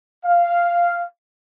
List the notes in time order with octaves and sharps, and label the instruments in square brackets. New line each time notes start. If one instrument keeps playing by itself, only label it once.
[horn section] F5